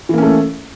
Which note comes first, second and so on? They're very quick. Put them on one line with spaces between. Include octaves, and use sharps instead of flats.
E3 A#3 C#4 A3